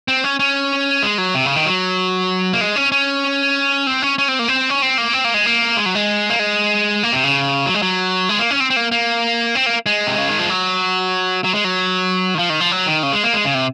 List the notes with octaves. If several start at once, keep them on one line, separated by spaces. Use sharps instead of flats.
C4
C#4
C#4
G#3
F#3
C3
C#3
D#3
F#3
A#3
G#3
C#4
C#4
C4
C#4
C#4
C4
A#3
C4
C#4
C4
A#3
C4
A#3
G#3
A#3
G#3
F#3
G#3
A#3
G#3
A#3
C3
C#3
F#3
G#3
F#3
G#3
A#3
C#4
C4
C4
A#3
A#3
C4
A#3
G#3
C3
C#3
D#3
F3
F#3
F#3
G#3
F#3
D#3
F3
D#3
F3
F#3
D#3
C#3
G#3
A#3
G#3
C#3
C3